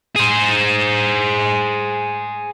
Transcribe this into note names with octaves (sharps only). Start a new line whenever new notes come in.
G#4 C5